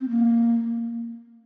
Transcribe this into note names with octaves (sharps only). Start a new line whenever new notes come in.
C4
A#3